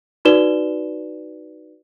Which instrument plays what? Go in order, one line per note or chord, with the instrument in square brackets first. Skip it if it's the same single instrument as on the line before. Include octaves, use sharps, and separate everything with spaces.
[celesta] D#4 F#4 B4 D5 E7 G7